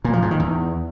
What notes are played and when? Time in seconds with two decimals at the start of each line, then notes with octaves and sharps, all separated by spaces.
0.04 A#2
0.13 F3
0.22 G#2
0.31 D#3
0.40 E2